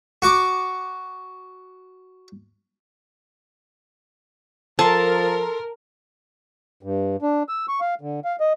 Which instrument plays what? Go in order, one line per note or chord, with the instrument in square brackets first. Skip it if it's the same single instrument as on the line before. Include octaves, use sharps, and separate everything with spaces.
[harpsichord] F#4 C#6 D6
[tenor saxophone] F3 [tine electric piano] A4 C6 [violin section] A#4 [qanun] A5
[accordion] G2
D4
E6
C#6
F5
D3
F5
D#5